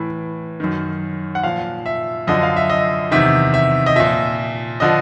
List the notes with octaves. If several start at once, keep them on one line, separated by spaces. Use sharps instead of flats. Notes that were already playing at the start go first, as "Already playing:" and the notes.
Already playing: A2 E3
F#2 D#3
F#5
A#2 F3 F5
E5
F#2 D3 F3 D#5
F5
E5
D#5
E2 C3 D#3 E5
E5
D#5
A#2 F3 E5
D3 F3 D#5